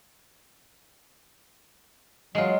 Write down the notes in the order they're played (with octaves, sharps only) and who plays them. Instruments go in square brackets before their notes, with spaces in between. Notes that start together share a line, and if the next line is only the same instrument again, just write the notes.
[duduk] F#3 [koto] G#3 F4